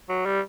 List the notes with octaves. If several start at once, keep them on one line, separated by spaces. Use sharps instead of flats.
F#3
G3